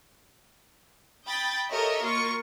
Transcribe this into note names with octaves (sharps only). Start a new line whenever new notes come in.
G5 B5 D#6 G6 A6
G4 A4 A#4 C#5 D#5 E5
A#3 F4 C#6